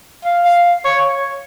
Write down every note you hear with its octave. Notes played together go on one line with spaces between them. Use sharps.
F5
F5
C#5